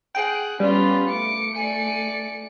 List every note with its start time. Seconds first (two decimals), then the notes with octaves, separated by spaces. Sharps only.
0.15 G#4 F#5 G5
0.60 G3 B3 C#4 F4 G4
1.10 A3 D6 C#7
1.55 D5 G#5